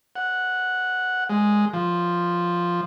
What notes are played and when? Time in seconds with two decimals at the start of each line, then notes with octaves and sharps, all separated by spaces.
0.16 F#5
1.30 G#3
1.73 F3